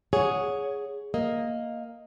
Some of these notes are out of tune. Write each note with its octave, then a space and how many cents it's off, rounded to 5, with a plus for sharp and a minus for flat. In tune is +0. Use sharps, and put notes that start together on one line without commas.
G#4 +0 C#5 +10 F#5 -15
A#3 +0 D#5 +10